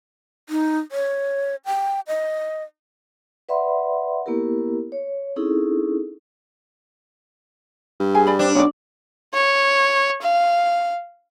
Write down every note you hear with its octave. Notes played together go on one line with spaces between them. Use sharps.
D#4
C#5
G5
D#5
B4 D5 E5 F#5 B5 C6
A#3 B3 E4 G4 A#4
C#5
C4 C#4 D#4 E4 G#4 A4
G2
G#4 G#5
D5 B5
C4 D4
B1 F#3 C#4 F#4 D5
C#5
F5